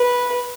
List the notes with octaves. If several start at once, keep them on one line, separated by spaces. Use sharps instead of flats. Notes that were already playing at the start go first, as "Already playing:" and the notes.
Already playing: B4